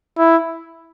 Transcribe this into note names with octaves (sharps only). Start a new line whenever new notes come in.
E4